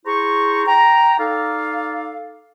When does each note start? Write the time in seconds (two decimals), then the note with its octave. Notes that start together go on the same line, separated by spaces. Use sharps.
0.06 E4 G#4 C5 A#5 C#6
0.66 G5 A#5
1.18 D#4 A4 D5 F5